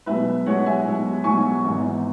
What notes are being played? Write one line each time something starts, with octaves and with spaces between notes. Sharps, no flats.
B1 B2 G#3 B4 E5
B1 B2 G#3 C#5 F#5
E5 G#5
B1 B2 G#3
B1 B2 G#3 G#5 C#6
G#1 G#2 E3 B3